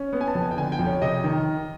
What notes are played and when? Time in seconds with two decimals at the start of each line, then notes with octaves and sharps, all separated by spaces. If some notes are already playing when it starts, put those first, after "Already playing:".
Already playing: C#4
0.13 B3
0.21 G#5
0.28 A5
0.35 F2
0.42 G#5
0.51 G5
0.57 D3 G#5
0.72 G5
0.79 F2
0.86 C#5
1.02 C3 D#5
1.24 D#3